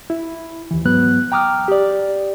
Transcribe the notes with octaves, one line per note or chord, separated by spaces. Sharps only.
E4
D#2 E3
G#2 F#3 B3 F#6
G5 A#5 D6 D#6 F6
G4 D5